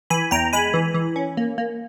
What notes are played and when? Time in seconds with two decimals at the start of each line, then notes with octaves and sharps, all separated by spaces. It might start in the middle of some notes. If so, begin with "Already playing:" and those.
0.10 E3 G#5 B5
0.31 E2 G5 A#5
0.53 G#3 G#5 B5
0.74 E3
0.94 E3
1.16 C#4
1.37 A#3
1.58 A#3